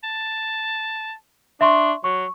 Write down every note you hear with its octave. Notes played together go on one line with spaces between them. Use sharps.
A5
D4 E5 C6 C#6
F#3 C#6